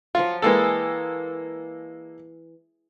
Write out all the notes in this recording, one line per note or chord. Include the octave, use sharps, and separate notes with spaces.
F3 F#3 F4 C#6
E3 G#3 A#3 G#4 A4 G5